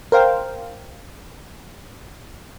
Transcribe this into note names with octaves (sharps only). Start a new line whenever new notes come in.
A#4 C5 F5 G5